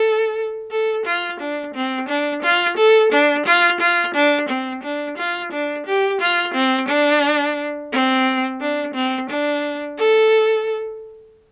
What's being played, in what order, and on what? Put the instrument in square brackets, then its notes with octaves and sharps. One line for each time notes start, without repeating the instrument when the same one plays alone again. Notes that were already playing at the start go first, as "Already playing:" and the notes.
Already playing: [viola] A4
A4
F4
D4
C4
D4
F4
A4
D4
F4
F4
D4
C4
D4
F4
D4
G4
F4
C4
D4
C4
D4
C4
D4
A4